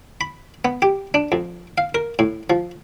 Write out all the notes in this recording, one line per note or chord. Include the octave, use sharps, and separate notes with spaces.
B5
B3
G4
D4
F2
F5
A#4
A2
F3